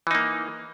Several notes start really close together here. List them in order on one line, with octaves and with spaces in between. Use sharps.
E3 D#4 A#3